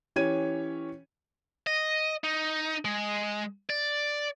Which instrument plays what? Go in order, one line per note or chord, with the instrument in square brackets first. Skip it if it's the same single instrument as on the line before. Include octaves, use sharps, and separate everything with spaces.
[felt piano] E3 C#4 G4 C#5 G#6 D#7
[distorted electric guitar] D#5
D#4
G#3
D5